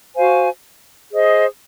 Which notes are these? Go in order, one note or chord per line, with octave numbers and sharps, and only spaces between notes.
F#4 C5 F5 G#5
G#4 C5 D#5